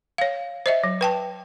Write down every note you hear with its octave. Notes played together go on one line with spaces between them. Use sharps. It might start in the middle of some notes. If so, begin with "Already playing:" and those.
C#5 F5
C5 D#5 E5
F#3
B4 G5 A5